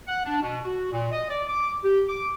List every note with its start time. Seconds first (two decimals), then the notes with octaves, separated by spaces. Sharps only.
0.07 F#5
0.25 D4
0.42 B2
0.64 F#4
0.92 A#2
1.12 D#5
1.29 D5
1.48 D6
1.84 G4
2.09 D6